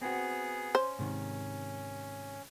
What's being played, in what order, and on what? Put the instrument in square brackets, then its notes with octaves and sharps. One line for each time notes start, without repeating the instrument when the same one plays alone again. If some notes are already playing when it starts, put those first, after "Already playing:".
[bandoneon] B3 G#4 [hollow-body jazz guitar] C4 F#4
[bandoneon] C#4 [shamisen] C5
[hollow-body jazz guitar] G#2 C3 D#3